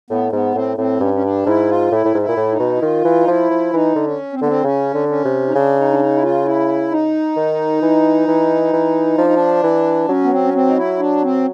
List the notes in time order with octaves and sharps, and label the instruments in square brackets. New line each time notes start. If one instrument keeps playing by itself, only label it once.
[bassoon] A2 [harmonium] B3
[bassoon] G#2 [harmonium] B3
[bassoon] A2 [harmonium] C4
[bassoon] A2 [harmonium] C4
[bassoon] G2 [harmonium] C#4
[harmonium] C#4
D4
[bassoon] G#2 [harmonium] E4
[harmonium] F4
[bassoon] A2 [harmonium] E4
[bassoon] A2
G#2
[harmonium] E4
[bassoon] A#2
A2
[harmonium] D#4
[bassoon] B2
[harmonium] E4
[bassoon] D#3 [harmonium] F4
[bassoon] E3
[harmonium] D#4
[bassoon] F3 [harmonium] E4
[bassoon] F3
[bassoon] E3 [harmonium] D#4
[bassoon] D3
[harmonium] C#4
C4
[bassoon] D3 [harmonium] B3
[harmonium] C4
[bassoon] C#3 [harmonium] C#4
[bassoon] D3
[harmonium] C#4
[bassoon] C3
[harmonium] D#4
[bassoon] C#3 [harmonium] D4
[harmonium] D#4
D4
D#4
E4
F4
E4
D#4
[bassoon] D#3
E3
E3
E3
[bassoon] F3 [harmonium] D4
[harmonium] D#4
D4
[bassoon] E3
[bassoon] F#3 [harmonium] C#4
[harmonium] B3
C4
C#4
C4
D#4
E4
D4
C4